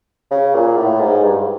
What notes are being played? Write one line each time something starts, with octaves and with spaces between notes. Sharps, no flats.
C#3
A#2
A2
G#2
G2